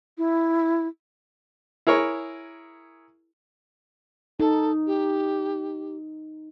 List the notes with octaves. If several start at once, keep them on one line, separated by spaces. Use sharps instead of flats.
E4
E4 G#4 A#4 C#5
D#4 A4
G4